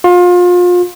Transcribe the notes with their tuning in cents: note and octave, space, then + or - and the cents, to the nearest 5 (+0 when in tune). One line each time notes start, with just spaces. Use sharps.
F4 +30